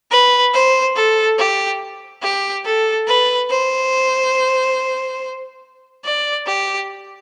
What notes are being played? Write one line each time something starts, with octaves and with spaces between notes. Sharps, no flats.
B4
C5
A4
G4
G4
A4
B4
C5
D5
G4